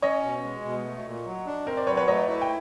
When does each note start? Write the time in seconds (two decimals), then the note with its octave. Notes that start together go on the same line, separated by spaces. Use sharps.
0.02 C#4 C#5 D#5
0.23 B2
0.44 G#3
0.65 B2
0.85 A3
1.06 A#2
1.26 F#3
1.46 D4
1.66 C4 A#4 C5
1.77 C5 D5
1.87 F#3 B4 C#5
1.97 B4 C#5
2.08 A3 C#5 D#5
2.29 E4
2.41 G5